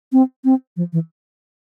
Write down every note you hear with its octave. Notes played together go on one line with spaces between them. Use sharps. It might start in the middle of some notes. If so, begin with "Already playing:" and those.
C4
C4
F3
E3